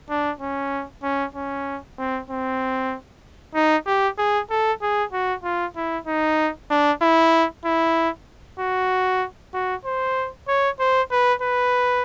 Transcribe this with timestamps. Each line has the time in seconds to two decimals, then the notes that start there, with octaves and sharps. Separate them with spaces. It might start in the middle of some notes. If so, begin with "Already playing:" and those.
0.10 D4
0.41 C#4
1.03 C#4
1.34 C#4
1.99 C4
2.30 C4
3.55 D#4
3.86 G4
4.18 G#4
4.50 A4
4.82 G#4
5.13 F#4
5.44 F4
5.76 E4
6.07 D#4
6.70 D4
7.02 E4
7.65 E4
8.60 F#4
9.54 F#4
9.85 C5
10.48 C#5
10.80 C5
11.12 B4
11.42 B4